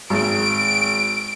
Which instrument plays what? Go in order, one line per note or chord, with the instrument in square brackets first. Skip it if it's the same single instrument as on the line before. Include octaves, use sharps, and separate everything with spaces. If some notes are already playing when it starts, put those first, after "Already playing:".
[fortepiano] G#1 [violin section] D7